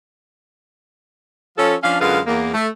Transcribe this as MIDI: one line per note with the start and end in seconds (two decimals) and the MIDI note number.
1.57 1.75 53
1.57 1.75 61
1.57 1.75 69
1.83 2.00 53
1.83 2.00 61
1.83 2.00 62
1.83 2.00 77
2.00 2.19 42
2.00 2.19 50
2.00 2.19 56
2.00 2.19 65
2.00 2.19 71
2.00 2.19 77
2.26 2.51 40
2.26 2.51 58
2.54 2.68 57